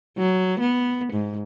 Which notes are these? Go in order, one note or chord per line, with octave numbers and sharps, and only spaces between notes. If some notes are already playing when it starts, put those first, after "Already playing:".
F#3
B3
G#2